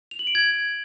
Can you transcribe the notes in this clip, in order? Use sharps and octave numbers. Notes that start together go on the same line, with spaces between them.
F7
F#7
D7
G#6